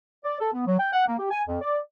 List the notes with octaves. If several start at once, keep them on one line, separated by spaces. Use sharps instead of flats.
D5
A4
B3
F#3
G5
F#5
A#3
G4
G#5
F2
D5